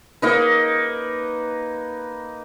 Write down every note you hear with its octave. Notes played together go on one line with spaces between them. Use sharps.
A#3 D#4 B4